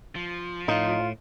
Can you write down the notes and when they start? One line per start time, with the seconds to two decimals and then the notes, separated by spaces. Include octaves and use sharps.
0.16 F3
0.68 A2 D#4 F4